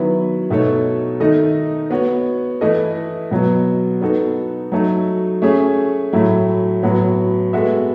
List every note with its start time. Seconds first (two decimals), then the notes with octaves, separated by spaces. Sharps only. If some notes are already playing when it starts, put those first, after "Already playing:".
Already playing: D#3 F#3 B3 E4 B4
0.50 B2 A3 D#4 A4 C#5
1.20 D#3 A3 D#4 A4 D#5
1.91 B3 F#4 C#5
2.61 E3 A3 E4 A4 D#5
3.31 B2 F#3 B3
4.01 B3 D#4 F#4 A4
4.72 F#3 A3 D#4 A4
5.42 A3 C#4 G#4 C#5 E5
6.13 A2 F#3 A3 E4
6.83 A2 F#3 B3 F#4
7.53 G#3 B3 F#4 A4 E5